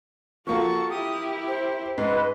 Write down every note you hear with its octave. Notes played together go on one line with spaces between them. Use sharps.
F3 A#3 F4 F#4 A4 C#6
E4 G4 D#6
C5
G#2 B4 D#5